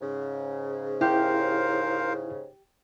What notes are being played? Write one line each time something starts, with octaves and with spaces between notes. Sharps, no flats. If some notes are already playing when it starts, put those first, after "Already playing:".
G#2 C#3
E4 G4 A#4 C5 F5